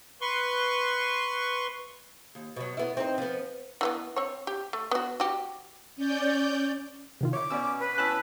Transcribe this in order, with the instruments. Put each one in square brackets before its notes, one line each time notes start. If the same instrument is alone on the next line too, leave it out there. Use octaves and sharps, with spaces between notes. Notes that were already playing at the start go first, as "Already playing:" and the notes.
[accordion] B4 C6 C#6
[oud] D#2
B2 F#3
B3 E4
C4 D#4
F3 B3
[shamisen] E3 A#3 B3
C4 C#5
G4
A3
B3 F#4
F#4 G4
[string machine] C#4 D5 G6
[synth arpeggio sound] C3 D#3 F4
[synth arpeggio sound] E4 C#5 [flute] D6
[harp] B2 [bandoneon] C#4 [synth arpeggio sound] D5 E6
[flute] B4
[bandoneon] C#4 [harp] E4 A5 F#6